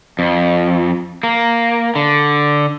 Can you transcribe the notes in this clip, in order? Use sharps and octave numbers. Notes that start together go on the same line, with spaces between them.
F2
A#3
D3